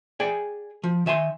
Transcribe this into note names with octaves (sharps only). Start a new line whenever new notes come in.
G#4 D5 G5 G#5
F3
D#3 E5 G#5 C6